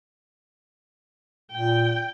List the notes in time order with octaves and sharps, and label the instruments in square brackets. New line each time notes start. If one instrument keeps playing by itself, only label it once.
[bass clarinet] A#2 [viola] G5